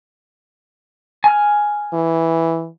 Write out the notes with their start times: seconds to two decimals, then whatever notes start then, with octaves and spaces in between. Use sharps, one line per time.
1.24 G#5 F6
1.93 E3